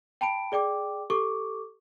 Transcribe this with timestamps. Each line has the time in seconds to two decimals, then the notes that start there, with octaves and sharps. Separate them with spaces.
0.21 G5 A5 B5 D7
0.52 G#4 D5 G5 D6
1.10 G4 A4 C#6 D6